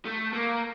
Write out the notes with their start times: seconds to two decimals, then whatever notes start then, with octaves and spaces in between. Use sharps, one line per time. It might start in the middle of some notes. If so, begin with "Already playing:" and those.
0.05 A3
0.33 A#3